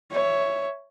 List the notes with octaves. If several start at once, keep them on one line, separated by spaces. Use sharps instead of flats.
C#5 E5